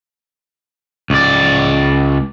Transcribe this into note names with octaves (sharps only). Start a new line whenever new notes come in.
C#2 D5